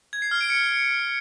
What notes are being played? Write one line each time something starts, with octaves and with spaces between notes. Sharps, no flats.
G#6
C7
F6
D7
C#7